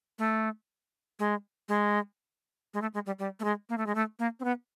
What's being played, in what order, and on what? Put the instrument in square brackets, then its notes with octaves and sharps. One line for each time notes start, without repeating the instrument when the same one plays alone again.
[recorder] A3
G#3
G#3
G#3
A3
G#3
G3
G3
A3
G#3
A#3
A3
G#3
A3
A#3
C4
B3